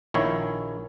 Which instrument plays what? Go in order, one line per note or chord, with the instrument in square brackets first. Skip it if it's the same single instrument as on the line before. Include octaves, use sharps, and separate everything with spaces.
[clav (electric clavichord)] A#1 D#3 E4 C#5